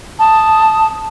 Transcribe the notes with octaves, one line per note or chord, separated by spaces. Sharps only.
A5 D#6